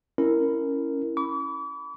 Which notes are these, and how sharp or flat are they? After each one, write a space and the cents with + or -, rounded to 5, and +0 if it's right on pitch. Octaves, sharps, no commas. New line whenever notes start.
C#4 +0 E4 +0 A#4 -10
B5 +0 D6 -45